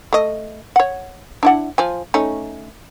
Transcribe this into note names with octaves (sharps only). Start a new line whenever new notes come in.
A3 D#5
C#5 F#5
D4 E4 F#5
F3 G#5
A3 C#4 D#4